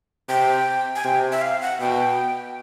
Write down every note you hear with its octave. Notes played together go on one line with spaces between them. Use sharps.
C3 G5
G#5
C3 G5
E5
F5
F#5
B2 G5